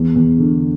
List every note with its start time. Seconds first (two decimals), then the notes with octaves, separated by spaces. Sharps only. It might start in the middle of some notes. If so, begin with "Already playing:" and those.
Already playing: E2
0.16 E2
0.38 D3